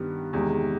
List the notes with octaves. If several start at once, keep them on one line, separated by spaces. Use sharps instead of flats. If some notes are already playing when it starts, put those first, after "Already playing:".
Already playing: G2 D#3 G3 B3
E2 C3 D#3 G#3